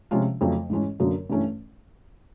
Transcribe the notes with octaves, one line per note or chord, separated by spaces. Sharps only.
C3 F3 G#3 C#4 F4
F2 C#3 F#3 A3
G#2 E3 G#3 C#4
F#2 D3 F#3 A#3
G2 E3 A3 C#4